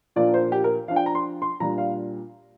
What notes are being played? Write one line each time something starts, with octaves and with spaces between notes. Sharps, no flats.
A#2 F3 A#3 D4 D5
C5
G4
A#4
F3 D4 F5
G5
A#5
C6
C6
A#2 G3 D4 A#5
F5